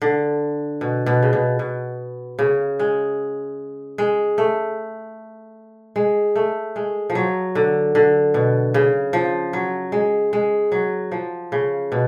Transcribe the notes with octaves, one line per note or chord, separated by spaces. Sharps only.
D3
B2
B2
C#3
B2
B2
C#3
G#3
G#3
A3
G#3
A3
G#3
F3
F#3
D3
D3
B2
C#3
F3
F#3
G#3
G#3
F#3
F3
C#3
B2